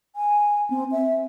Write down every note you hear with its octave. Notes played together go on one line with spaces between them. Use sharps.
G#5
C4
E5